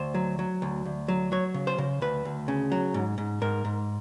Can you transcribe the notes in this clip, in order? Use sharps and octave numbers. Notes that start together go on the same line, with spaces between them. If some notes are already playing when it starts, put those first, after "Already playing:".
Already playing: D2 C5
F#3
F#3
D2
D2
F#3
F#3 C#5
C#3
C5
C#3
D2 B4
D2
C#3
F#3
G#2
G#2
G#2 A#4
G#2